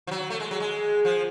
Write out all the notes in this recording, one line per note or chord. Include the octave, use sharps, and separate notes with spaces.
F3
F#3
A3
G#3
F#3
G#3
F3